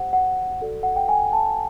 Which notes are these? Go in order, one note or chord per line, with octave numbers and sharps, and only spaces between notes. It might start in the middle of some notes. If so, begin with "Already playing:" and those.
Already playing: G4 C5 F#5
F#5
F#4 A4 D5
F#5
G5
G#5
A5